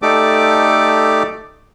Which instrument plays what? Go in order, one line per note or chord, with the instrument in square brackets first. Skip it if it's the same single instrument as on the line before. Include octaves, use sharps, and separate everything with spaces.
[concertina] A3 D#4 G4 A4 D5 D6